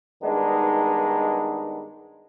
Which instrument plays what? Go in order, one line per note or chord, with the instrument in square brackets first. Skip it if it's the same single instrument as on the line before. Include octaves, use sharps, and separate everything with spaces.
[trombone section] G2 D#3 G#3 B3 D4 D#4